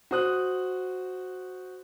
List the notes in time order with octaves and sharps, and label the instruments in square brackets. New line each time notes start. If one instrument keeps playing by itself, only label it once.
[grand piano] F#4 C5 D#6 F#6